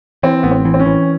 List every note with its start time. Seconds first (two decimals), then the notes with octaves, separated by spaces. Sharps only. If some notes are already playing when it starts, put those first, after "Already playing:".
0.23 E3 C4
0.43 A1 B3
0.51 C4
0.65 E3
0.74 C4
0.79 C#4
0.86 E3